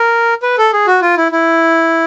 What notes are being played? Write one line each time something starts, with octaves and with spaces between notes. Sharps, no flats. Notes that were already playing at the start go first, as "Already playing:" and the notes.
Already playing: A#4
B4
A4
G#4
F#4
F4
E4
E4